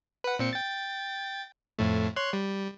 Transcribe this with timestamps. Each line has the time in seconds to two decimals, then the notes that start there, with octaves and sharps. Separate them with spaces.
0.24 B4 F#5
0.39 A#2 C4 C#7
0.53 G5 A6
1.79 F2 A2 A3
2.16 C#5 C6 F#6
2.33 G3